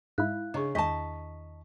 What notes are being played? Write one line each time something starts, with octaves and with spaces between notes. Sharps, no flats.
G#2 E4 F5 F#6
C#3 D4 G#4 D#5 A#5 C#6
E2 D#3 D#5 A5 A#5 C#6 B6